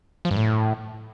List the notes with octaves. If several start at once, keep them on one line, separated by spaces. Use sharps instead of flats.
F3
G2
A2